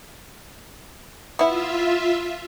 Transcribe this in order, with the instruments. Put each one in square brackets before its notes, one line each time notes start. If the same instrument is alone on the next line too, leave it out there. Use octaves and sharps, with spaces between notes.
[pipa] B3 E4 [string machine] F4 E5